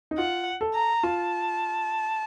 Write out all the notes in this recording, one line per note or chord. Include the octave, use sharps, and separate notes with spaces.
D#4
F4 F#5
A4
A#5
F4 A5